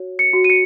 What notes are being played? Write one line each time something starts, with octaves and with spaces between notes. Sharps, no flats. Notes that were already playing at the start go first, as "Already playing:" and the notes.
Already playing: F#4 C#5
C#7
F#4
D#7
C#7